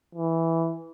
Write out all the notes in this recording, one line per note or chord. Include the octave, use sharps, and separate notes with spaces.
E3